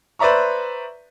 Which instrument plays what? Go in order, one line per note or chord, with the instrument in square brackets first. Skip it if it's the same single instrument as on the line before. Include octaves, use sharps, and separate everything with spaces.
[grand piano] B4 C5 D5 E5 A#5 C#6